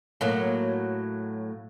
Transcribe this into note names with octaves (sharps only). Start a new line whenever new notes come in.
A2 F#3 A#3